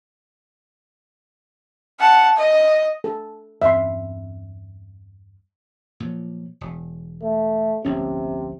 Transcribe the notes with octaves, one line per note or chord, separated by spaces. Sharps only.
F#5 A5
D#5
A4
E2 G2 C4 E5 C6
A#2 F3 F#3
E1
A3
D1 A#1 C3 C#4